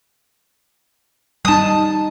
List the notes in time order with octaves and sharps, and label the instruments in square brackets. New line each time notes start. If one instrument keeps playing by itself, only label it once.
[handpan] G3 D#4 [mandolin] A5 D#6